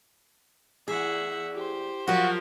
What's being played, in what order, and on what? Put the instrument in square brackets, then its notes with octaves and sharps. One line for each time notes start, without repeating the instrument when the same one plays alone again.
[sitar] E2 [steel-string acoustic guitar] G#4 [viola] E5 F#5
[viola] G4 C5
[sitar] F3 F#3 [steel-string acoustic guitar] F4 A#4 [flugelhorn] F#4